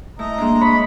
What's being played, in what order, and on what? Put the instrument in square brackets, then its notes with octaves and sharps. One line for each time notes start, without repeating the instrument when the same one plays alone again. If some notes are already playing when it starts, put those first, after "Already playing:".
[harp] A3 E4 [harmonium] D#5 A#5
[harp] G#3 A#3 D4
[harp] C#5 [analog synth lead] B5